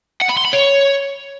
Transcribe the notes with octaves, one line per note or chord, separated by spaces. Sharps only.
F#5
B5
C6
B5
C#5